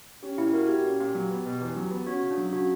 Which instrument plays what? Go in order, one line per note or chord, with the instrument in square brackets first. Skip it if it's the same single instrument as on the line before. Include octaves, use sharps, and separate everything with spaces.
[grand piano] C#4 [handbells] G4
[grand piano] A#2 [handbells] E4
[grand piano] A#3 [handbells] F#4 A#4
[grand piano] A#2 [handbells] G4
[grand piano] C#4
A#2
F#3
B3
B2
E2
F#3
B3
[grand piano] C#4 [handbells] F#4
[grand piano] C#3
[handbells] D4
[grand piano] F#3
[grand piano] C#3 [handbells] F#4